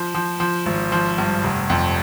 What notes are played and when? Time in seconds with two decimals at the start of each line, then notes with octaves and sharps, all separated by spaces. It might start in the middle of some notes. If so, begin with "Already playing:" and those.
Already playing: F3
0.15 F3
0.40 F3
0.66 G#1
0.92 F3
1.18 G2
1.44 F1
1.70 F2